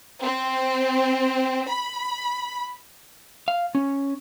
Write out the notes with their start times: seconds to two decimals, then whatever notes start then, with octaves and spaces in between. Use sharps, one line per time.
0.22 C4
1.68 B5
3.48 F5
3.75 C#4